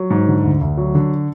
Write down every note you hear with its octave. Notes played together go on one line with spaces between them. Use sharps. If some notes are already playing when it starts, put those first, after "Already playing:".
Already playing: F#3
G#2
D3
D2
D2
F#3
D3